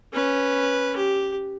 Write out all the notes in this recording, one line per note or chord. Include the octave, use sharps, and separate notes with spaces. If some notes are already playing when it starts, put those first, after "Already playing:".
C#4 B4
G4